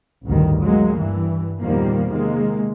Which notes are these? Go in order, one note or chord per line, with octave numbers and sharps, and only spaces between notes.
A1 D2 G2 D#3
F#3 G#3 A#3
G2 E3
E2 A#2 D#3 F3 G3 A#3
C3 D#3 G#3 A#3